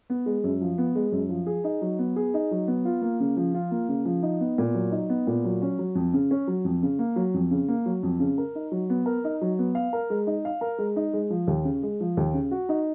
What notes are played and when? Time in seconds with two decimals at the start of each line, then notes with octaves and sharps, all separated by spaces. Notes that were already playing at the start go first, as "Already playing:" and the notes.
0.10 B3
0.26 G#3
0.44 F#2
0.61 F3
0.78 B3
0.95 G#3
1.12 F#2
1.29 F3
1.47 G#4
1.64 D#4
1.82 F#3
1.99 B3
2.16 G#4
2.34 D#4
2.51 F#3
2.68 B3
2.85 F4
3.02 A#3
3.20 C#3
3.37 F3
3.54 F4
3.71 A#3
3.89 C#3
4.05 F3
4.23 D#4
4.40 B3
4.58 A#2
4.74 F#3
4.92 D#4
5.10 B3
5.27 A#2
5.44 F#3
5.62 C#4
5.79 F#3
5.95 F2
6.14 C#3
6.31 C#4
6.48 F#3
6.65 F2
6.83 C#3
6.99 A#3
7.16 F#3
7.34 F2
7.51 C#3
7.68 A#3
7.86 F#3
8.03 F2
8.20 C#3
8.38 A#4
8.55 D#4
8.72 F#3
8.90 B3
9.06 A#4
9.24 D#4
9.41 F#3
9.59 B3
9.75 F5
9.93 A#4
10.10 G#3
10.27 D#4
10.45 F5
10.61 A#4
10.78 G#3
10.96 D#4
11.13 G#3
11.30 F3
11.47 D#2
11.65 C#3
11.83 G#3
12.00 F3
12.17 D#2
12.34 C#3
12.51 F#4
12.69 D#4